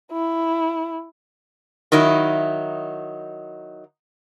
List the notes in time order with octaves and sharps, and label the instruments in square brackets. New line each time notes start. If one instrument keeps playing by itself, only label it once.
[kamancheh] E4
[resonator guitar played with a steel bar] D#3 F#3 D#4 E4